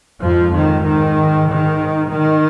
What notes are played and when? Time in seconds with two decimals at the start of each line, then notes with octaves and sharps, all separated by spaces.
0.22 F2 G#2 F3
0.54 D#3
0.86 D#3
1.50 D#3
2.13 D#3